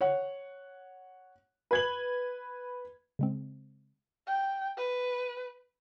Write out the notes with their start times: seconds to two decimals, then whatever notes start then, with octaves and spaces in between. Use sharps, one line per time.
0.01 C#5 F#5
1.71 B4 G#6 F#7
3.19 C#3 G#3 C4
4.27 G5
4.77 B4